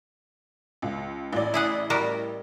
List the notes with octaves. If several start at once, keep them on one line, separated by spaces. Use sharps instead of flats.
C#2
A1 D5
E4 G#4 F#5
G3 F#4 A#4